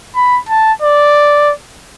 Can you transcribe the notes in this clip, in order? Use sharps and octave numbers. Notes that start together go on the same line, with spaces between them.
B5
A5
D5